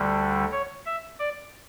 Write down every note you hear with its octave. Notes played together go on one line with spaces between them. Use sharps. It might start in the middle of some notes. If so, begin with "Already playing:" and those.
Already playing: D2 D3 G3
C#5
E5
D5